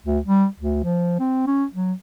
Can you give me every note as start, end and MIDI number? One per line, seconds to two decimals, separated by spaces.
0.06 0.19 38
0.26 0.46 55
0.60 0.81 38
0.84 1.15 53
1.19 1.43 60
1.47 1.65 61
1.74 1.93 54